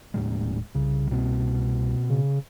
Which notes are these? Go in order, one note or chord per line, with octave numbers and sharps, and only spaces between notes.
D#2 A2 G#3
D#1
C2 C#3
B2 A#3 C4
C#3